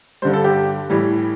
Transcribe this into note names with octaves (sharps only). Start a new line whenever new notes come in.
G2 D3 G3 C5
A4
G4
A2 E3 G3